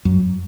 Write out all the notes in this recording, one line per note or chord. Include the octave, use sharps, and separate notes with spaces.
F#2